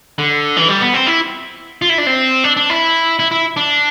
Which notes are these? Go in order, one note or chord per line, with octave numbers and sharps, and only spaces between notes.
D3
E3
G3
B3
C4
E4
F4
E4
D4
C4
D4
D4
E4
E4
E4
D4